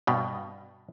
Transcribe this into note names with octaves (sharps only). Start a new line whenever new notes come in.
G2 B2